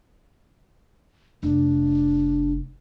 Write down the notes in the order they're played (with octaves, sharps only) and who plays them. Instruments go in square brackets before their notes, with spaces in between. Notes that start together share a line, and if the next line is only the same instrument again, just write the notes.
[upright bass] F1 [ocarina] D4